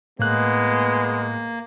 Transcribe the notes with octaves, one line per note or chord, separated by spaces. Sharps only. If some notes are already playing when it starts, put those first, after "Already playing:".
A2 G#3 A#3 B3 F#6